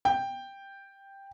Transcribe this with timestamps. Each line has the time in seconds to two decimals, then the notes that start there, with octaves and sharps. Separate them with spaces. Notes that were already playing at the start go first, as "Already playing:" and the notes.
0.05 G5